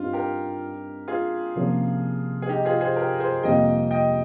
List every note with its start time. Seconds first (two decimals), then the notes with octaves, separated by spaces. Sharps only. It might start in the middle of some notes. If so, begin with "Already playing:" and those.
Already playing: G2 G3 C4 D#4 F4
0.13 G4 A#4
1.08 F4 G#4
1.56 C3 F3 A#3 C#4
2.42 G#4
2.49 D#4 G4
2.65 F4 G#4
2.81 G#4 C5
2.96 G4 A#4
3.20 G#4 C5
3.43 F2 C3 G3 A#3 D#5 G5
3.91 D#5 G5